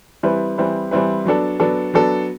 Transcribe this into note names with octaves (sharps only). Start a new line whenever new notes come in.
E3 G3 C4 E4 B4
E3 G3 C4 E4 B4
E3 G3 C4 E4 B4
F#3 B3 D4 A4
F#3 B3 D4 A4
F#3 B3 D4 A4